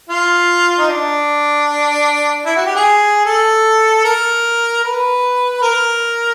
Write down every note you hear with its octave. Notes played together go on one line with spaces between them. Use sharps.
F4
D#4
D4
E4
F#4
G4
G#4
A4
A#4
B4
A#4